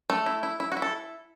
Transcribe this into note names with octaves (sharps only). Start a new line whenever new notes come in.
A3
E4
E4
E4
F#4
E4
A4